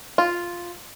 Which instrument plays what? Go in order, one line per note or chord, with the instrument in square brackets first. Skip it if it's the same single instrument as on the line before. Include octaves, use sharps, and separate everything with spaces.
[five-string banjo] F4